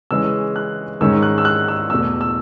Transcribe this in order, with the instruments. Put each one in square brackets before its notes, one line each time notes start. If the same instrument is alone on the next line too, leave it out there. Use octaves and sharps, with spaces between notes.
[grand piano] C#3 E3 G#3 C#4 E6
F#6
G#2 D#3 G#3 C#4 E6
F#6
E6
F#6
E6
E2 B2 A3 E6
E6